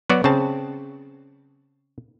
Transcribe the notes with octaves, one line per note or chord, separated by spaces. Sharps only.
F#3 B3 F#4 D5
C#3 C4 A5